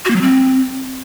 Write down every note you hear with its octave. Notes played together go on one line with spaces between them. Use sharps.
F#4
A#3
F#3
C4